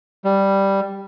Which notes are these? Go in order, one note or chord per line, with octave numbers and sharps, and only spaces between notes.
G3